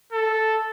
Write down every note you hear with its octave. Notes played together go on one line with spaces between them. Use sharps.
A4